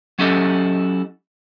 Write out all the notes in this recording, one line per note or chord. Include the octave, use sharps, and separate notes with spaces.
F#3 C#4 E4 G4 A4 D#5